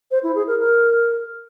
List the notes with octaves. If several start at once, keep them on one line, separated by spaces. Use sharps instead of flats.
C5
E4
G#4
A#4
A#4